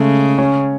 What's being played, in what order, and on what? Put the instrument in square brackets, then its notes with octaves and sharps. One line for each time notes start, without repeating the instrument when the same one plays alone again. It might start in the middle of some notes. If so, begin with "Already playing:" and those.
Already playing: [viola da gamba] C#3 [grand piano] G#3 A3
[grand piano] C#4